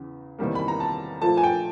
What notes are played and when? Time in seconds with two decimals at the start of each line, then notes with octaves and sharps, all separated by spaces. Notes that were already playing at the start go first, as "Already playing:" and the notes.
Already playing: E2 C#3
0.39 E2 C3 D#3 G3 A#3
0.55 B5
0.68 A#5
0.80 A5
1.22 A#2 F3 A3 A5
1.37 G#5
1.43 G5